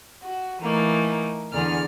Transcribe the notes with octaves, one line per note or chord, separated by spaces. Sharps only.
F#4
E3 A3 A#3 D#4
E2 D3 G#4 D5 A#5 F6